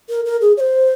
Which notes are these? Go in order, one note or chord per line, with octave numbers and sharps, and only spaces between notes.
A#4
A#4
G#4
C#5
C5